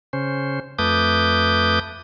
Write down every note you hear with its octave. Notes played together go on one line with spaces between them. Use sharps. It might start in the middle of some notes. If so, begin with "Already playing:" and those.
C#3 C#4 C5
F2 A3 B4 D6 D#6 G6